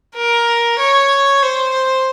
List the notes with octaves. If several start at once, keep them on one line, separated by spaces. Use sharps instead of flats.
A#4
C#5
C5